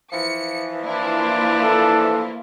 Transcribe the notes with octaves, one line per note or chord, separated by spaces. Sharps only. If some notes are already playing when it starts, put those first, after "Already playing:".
E3 F3 C#7
A#3 D4 E4 F4
A4